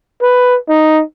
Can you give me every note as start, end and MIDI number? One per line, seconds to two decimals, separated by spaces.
0.22 0.57 71
0.69 1.03 63